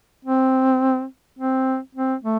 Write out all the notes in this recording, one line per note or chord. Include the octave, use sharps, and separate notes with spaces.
C4
C4
C4
A3